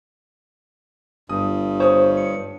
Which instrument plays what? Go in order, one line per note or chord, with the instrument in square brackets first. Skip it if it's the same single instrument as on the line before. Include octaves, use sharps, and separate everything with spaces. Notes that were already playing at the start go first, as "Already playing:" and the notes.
[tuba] G1 [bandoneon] G2 [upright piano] D#6
[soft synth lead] C5 [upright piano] C#5 D#6
[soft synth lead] C#7